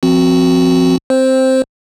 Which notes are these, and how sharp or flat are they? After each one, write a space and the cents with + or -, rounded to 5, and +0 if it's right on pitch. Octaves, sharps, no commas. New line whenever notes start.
F3 -10 C4 +0 F#4 +0
C4 +0 C5 +5